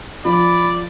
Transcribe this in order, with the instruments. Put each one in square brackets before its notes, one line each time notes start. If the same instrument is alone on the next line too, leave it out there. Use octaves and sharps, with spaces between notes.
[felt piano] F3 [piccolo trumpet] D5 [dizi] B5